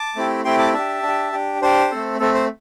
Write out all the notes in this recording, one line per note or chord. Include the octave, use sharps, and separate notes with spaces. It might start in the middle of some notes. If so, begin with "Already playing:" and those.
Already playing: A5 D6
A3 C4 E4 G4
A3 C4 E4 G4 G5 C6
A5 D6
D4 G4 E5 A5
D4 G4
D4 G4
D4 G4 C5
A3 C4 A4
A3 C4 A4
C5